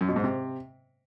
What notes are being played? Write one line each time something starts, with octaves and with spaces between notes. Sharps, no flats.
F#2
B2
G#2
C3